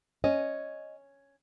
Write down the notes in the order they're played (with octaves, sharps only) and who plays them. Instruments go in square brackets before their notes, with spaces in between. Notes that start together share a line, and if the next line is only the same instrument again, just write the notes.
[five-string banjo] C#4 [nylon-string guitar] D#5